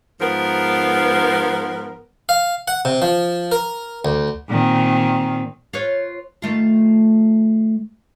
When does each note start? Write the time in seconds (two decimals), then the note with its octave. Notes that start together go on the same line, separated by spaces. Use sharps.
0.21 G#2 F3 B3 A#4
2.29 F5
2.68 F#5
2.85 C3
3.02 F3
3.52 A#4
4.05 D2
4.49 A#2 D#3 C4
5.73 F4 B4 C#5
6.42 D#3 A3 F4